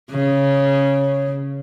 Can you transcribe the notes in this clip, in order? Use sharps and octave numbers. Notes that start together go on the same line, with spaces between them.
C#3